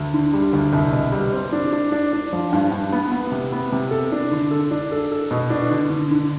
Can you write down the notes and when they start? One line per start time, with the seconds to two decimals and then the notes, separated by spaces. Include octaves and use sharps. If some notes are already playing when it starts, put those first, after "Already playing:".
Already playing: D2
0.14 D3
0.34 G3
0.53 D2
0.73 C2
0.93 B2
1.12 G3
1.33 C4
1.52 D4
1.73 D4
1.92 D4
2.13 D4
2.33 F3
2.53 G2
2.71 G2
2.92 B3
3.12 B3
3.32 C3
3.52 B3
3.72 C3
3.91 A4
4.12 D4
4.32 D3
4.51 A4
4.71 D4
4.92 A4
5.11 A4
5.31 B2
5.50 D4
5.70 D3
5.90 D3
6.11 D3